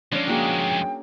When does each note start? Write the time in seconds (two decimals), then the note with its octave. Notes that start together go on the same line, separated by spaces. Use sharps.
0.12 F2 G#3 C#4 D4
0.27 A#3 F#4 G#4 G5